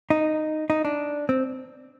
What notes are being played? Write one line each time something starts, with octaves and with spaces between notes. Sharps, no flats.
D#4
D#4
D4
C4